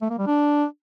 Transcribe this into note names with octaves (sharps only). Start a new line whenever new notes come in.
A3
A#3
G3
D4